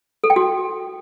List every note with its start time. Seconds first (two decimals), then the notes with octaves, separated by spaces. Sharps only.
0.24 A4
0.30 G5
0.36 F#4